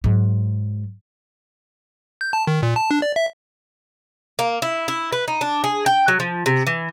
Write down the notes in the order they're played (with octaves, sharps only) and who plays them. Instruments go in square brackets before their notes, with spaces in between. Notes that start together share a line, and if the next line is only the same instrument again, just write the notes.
[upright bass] G#2 F#3
[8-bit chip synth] G6
A5
D#3
A#2
A5
D4
D5
E5
[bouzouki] A#3
E4
E4
B4
D#4
D4
G#4
G5
F#3
F3
C3
E3